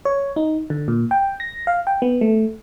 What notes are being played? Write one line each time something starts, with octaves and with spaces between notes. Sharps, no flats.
C#5
D#4
D3
A#2
G5
A#6
F5
G5
B3
A3